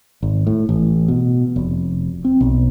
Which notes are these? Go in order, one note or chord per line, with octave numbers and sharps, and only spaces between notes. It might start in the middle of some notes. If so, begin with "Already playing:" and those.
G#1
A2
A1
B2
F1
C4
B1